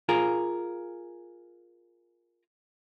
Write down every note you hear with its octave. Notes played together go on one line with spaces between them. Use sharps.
F4 G#4 A#4